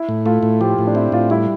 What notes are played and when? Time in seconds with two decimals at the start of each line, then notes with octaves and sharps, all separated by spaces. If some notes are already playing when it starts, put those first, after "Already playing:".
Already playing: E4
0.09 A2
0.26 A3 F4
0.43 A2
0.61 F3 G4
0.79 A2
0.87 D4
0.95 C4 E4
1.12 A2 F4
1.30 G3 E4